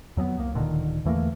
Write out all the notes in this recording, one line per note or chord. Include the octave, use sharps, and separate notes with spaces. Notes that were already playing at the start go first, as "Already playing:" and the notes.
F2 F#3 G3 B3
C2 A#3
D1 A#2 D3 D#3
E2 E3 A3 A#3